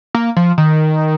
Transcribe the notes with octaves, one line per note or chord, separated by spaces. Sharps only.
A#3
F3
D#3